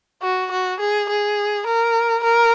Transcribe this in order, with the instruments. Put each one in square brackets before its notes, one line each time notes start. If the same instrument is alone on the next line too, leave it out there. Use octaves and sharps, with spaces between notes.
[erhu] F#4
F#4
G#4
G#4
A#4
A#4